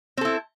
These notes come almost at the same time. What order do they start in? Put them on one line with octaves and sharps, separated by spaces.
C4 A4 E4